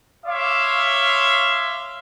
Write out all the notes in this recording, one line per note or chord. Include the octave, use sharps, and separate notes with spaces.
C#5 E5 F5 C6 D6